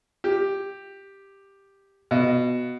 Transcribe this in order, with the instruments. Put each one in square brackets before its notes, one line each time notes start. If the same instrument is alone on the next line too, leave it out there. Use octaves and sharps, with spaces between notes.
[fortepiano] G4
B2